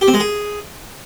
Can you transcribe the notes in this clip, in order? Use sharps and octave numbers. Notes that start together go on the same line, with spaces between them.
G4
C4
G#3
G#4